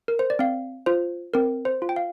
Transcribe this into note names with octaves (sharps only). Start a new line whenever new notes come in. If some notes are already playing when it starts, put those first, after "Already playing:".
A#4
C5
D5
C4 F5
F4 C5
C4 A#4
C5
F4
G5
F5